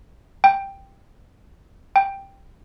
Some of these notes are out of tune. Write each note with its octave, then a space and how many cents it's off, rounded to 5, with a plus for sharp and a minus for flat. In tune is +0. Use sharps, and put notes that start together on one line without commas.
G5 +5
G5 +5